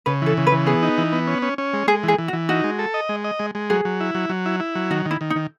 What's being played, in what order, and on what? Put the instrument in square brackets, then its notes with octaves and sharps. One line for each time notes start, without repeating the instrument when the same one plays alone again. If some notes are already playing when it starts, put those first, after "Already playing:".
[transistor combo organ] C#3 [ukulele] B4
[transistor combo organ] E3 [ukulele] A4
[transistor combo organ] C#3
[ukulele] B4
[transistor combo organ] E3
[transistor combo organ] B3 [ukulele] G#4
[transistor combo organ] D#4
E3
B3
C#4
C#4
C#4
G#3
[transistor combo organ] G#3 [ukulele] G#4
[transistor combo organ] E3 [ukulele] G#4
[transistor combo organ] E3
[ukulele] F#4
[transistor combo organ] E3
[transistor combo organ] D#4 [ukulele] F#4
[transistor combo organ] G#3
A4
D#5
G#3
D#5
G#3
G#3
[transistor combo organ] F#3 [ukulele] G#4
[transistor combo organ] F#3
E4
F#3
F#3
E4
E4
F#3
[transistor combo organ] D#3 [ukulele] F#4
[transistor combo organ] D#3
[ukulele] E4
[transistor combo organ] D#3
[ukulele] D#4
[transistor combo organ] D#3